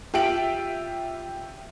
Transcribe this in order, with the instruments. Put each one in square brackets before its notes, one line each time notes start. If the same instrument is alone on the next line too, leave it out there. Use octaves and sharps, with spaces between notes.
[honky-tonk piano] F4 G4 E5 D7 F#7